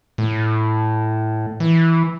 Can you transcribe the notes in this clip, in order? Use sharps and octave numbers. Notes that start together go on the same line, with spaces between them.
A2
E3